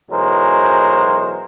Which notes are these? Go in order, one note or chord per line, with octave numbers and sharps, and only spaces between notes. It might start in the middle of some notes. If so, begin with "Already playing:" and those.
B1 E3 F#3 G#3 A#4 C5